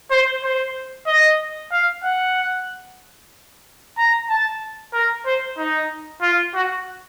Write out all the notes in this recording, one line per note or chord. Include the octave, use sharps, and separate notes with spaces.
C5
C5
D#5
F5
F#5
A#5
A5
A#4
C5
D#4
F4
F#4